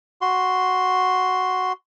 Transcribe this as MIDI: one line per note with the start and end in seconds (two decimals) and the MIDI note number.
0.21 1.72 66
0.21 1.72 84